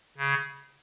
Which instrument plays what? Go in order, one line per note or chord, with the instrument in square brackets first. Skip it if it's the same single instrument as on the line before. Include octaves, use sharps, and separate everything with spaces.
[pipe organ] C#3